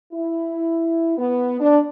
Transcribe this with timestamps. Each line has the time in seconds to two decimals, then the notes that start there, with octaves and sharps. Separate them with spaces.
0.13 E4
1.18 B3
1.60 D4